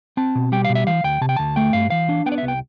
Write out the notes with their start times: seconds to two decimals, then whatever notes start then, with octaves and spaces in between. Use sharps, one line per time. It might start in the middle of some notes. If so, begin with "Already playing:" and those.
0.17 C4 A5
0.35 B2
0.52 G3 G5
0.65 B2 F5
0.75 E5
0.87 E3 F5
1.04 D2 G5
1.21 C3 A5
1.29 G5
1.37 D2 A5
1.56 A3 G5
1.73 G2 F5
1.90 E3 F5
2.09 D4
2.26 B3 G5
2.32 D5
2.38 C2 E5
2.48 G5